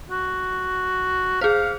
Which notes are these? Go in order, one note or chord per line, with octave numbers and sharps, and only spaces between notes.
F#4
G#4 C5 F5